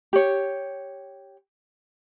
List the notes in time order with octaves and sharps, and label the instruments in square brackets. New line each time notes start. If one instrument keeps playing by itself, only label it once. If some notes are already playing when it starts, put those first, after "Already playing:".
[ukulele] G4 C#5